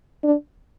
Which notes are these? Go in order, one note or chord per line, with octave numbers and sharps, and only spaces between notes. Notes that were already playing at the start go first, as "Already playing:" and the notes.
D4